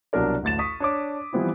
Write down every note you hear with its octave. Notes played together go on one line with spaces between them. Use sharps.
C2 B2 F#3 D4 A#4 D5
A1 D2 A6 E7
C#6 D#6 B6
D4 C#5 D6
E3 F3 G3 B3 C4 E4